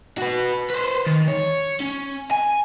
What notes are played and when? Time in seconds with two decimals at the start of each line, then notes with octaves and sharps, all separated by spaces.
0.18 F#4 B4
0.70 B4 C5
1.07 D#3
1.28 C#5
1.80 C#4
2.31 G#5